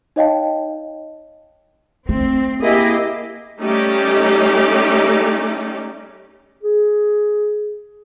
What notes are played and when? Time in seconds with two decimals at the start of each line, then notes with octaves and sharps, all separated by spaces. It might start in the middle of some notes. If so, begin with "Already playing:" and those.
0.16 D#4 C#5 D#5 F5 G5 A5
2.09 A3 C4
2.62 A#3 E4 G4 G#4 D#5 E5
3.60 G3 A3 C#4 D#4 G4
6.63 G#4